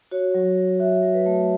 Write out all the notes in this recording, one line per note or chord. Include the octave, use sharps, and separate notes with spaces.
F#4 C#5
F#3
F#3
F#4 E5
F#3
B4
A3